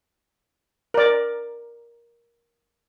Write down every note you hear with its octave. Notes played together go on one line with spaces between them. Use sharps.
A#4 D5